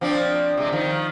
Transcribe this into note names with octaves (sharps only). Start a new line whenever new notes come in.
F3 C4 D4
C3 G#3
D#3 F3